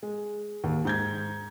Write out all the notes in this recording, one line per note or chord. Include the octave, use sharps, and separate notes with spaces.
G#3
D#2
G#2 G6 G#6